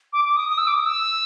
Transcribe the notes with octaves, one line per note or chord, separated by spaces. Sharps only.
D6
D6
D#6
D#6
E6
D6
D#6
E6